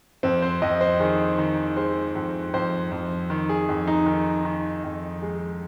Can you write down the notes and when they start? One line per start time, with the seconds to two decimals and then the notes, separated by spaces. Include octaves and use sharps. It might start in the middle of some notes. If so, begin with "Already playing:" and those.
0.23 F2 C4
0.42 C5
0.62 F2 D#5
0.81 C5
1.00 D#3 G#4
1.38 D#3
1.77 G#3 C5
2.15 F2
2.54 F2 C5
2.91 F2
3.30 D#3
3.49 G#4
3.69 F2
3.87 D#4
4.06 D#3
4.45 D#3
4.84 F2
5.22 G#3